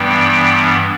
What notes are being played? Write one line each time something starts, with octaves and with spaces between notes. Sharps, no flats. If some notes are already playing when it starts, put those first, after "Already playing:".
Already playing: G2 E3 G3 B3 G5